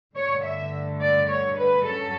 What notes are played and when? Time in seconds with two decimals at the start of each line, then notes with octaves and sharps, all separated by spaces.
0.15 G2 D3 A3 C#5
0.44 E5
1.01 D5
1.29 C#5
1.57 B4
1.85 G2 F#3 C#4 A4